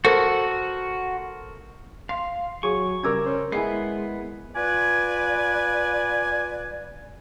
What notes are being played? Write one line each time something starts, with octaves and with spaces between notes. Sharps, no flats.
F#4 A4 A#4 C5
F5 C6
F#3 G#4 C#6
C#3 G3 A#4 D6 E6 G#6
C#4 C5
G#3 B3 E4 G#5 C7
F4 B4 D5 G#5